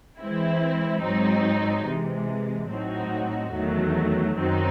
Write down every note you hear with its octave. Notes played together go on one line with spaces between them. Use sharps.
E3 G#3 C4 E4
G#2 F#3 C4 D#4
C3 E3 G#3
A2 F#3 C4 D#4 F#4
E2 D#3 F#3 A3
F#2 D#3 F#3 C4 D#4